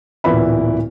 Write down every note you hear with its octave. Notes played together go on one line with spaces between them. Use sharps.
D1 A#2 E3 B3 E4 B5